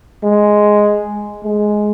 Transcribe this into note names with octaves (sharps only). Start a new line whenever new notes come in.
G#3
G#3